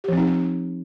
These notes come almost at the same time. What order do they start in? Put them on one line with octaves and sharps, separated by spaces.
G4 F3 C4 D#4